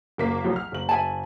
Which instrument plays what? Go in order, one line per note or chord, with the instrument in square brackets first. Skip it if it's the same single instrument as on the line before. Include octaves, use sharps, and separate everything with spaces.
[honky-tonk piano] F#1 A#3 B6
C2 F3 F#3
F6
F#1 F#7
[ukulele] E5 G#5 A5